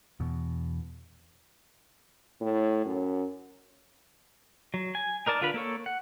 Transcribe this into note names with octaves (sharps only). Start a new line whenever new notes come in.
E2 B2
A2
F#2
F#3
G#5
D#4 A#4 D5 A5
D3 F4 A#4 B4 B5
A#3 A4 C#5
F#5